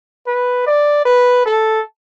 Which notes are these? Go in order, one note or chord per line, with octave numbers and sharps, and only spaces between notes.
B4
D5
B4
A4